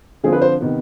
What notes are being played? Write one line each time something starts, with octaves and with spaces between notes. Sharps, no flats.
D3 F3 C4 G#4
B4
C5
C3 D#3 B3